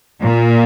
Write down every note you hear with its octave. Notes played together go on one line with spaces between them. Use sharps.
A#2